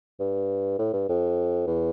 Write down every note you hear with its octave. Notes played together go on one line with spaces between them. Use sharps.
G2
A2
G2
F2
E2